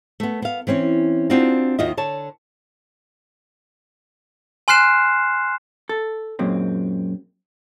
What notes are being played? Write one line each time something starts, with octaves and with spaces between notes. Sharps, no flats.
A3 B3
B3 F5
E3 C4 C#4 C#5
C4 D4 D#4 F4 F#4
D#2 D#3 F4 F#4 D#5 E5
D3 C#5 A5
G#5 C6 F6 F#6 C7 E7
A4
F#2 A#2 G#3 C4